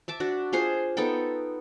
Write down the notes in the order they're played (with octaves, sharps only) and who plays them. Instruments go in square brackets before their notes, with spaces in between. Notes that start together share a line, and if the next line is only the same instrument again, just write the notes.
[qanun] E5 A5 D6
D4 F#4
F4 G#4 C5 C6
B3 D#4 A4 G5